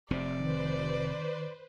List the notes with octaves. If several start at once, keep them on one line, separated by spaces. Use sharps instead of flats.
F1 C3 C4 D5
D#3 B4 C5